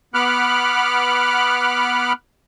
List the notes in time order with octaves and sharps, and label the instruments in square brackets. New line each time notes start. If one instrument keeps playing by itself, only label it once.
[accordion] B3 F#5 B5 D6 F6 F#6